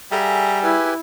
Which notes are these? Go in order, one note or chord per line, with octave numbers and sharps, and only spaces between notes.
G3 G#4 A4 E5 F#5 A#5
E4 G4 B4 G#5